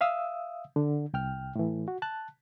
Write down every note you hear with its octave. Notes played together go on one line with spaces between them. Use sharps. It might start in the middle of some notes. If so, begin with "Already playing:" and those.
E5 F5 D#6 E6
D3
C2 G5 F6
A2 E3
F#4
A5 F#6